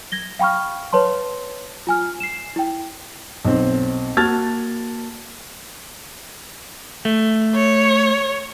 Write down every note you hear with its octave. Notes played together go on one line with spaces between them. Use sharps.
G#6 A#6 G7
F5 G5 B5 C#6 F6
B4 C#5 A5 C6
F4 G#5 F6
C7 E7
E4 G5
B1 C4
A#3 F#4 A5 F6 G#6 A6
A3
C#5